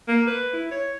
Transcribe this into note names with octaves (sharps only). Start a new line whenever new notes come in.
A#3
B4
E4
C#5